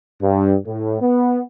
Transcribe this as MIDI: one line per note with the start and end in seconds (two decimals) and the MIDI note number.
0.21 0.55 43
0.66 0.97 45
1.01 1.39 59